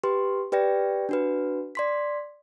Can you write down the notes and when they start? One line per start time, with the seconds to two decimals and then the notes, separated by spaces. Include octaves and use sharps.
0.04 G4 B4 C6
0.52 G4 B4 D5 G5 A#6
1.09 D4 F#4 B4
1.75 D5 C6 B6